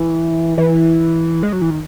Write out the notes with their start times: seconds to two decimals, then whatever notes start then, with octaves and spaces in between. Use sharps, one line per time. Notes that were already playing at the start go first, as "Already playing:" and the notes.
Already playing: E3
0.58 E3
1.43 G#3
1.53 F#3
1.62 E3
1.71 D#3